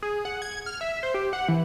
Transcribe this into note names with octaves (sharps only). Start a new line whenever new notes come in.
G#4
F#5
G#6
F6
E5
C5
G4
F#5
E3